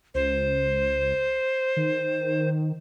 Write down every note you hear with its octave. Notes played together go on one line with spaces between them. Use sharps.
C#2 C5
D#3